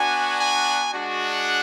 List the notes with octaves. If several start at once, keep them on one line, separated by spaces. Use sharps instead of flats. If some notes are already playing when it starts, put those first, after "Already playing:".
Already playing: B3 D4 F#4 G#5
G#5
G#3 D4 F#4